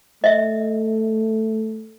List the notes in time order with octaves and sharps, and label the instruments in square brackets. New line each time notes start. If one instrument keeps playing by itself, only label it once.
[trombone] A3 [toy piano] D#5 E5